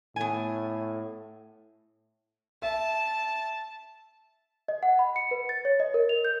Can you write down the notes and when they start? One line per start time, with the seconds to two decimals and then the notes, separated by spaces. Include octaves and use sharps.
0.16 A2 B3 G#5
2.62 E5 A5
4.68 D#5
4.83 F#5
4.99 B5
5.16 C#7
5.31 B4
5.49 A6
5.65 C#5
5.80 D#5
5.94 A#4
6.09 F7
6.25 G6